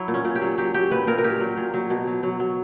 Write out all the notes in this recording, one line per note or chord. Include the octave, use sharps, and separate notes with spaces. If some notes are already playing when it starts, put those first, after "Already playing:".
Already playing: F#3 E4
A#2
C#4
A#2
G4
F#3
F#3 G4
F#3 G4
A#2 B4
A#2 A#4
A#4
A#2 G4
F#3
A#2
F#3
B2
F#3
F#3
F#3